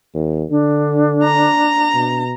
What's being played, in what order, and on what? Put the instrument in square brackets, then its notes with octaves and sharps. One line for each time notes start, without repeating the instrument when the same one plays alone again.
[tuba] D#2
[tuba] D3 [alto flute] D4
[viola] A#5
[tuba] B2